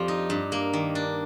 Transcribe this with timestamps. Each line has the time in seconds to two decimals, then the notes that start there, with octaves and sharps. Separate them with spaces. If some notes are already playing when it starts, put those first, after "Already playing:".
Already playing: F2 F3 G3
0.08 D#4
0.30 G2
0.52 A#3
0.73 D#3
0.95 D4